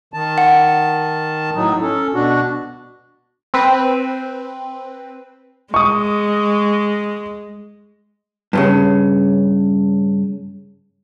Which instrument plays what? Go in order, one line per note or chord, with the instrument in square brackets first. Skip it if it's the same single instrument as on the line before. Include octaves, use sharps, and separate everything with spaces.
[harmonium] D#3 A5
[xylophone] F#5
[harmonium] A2 F#3 D#4
C#4 A4
B2 D4 F#4
[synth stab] C4 B4
[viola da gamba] G#3 [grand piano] C#6 D#6
[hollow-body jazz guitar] G2 A#2 C#3